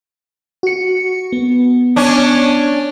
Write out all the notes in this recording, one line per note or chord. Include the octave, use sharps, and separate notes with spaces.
F#4 C#7
B3
C#4 D4